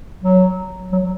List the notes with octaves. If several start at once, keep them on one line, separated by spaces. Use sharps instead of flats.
F#3
F#3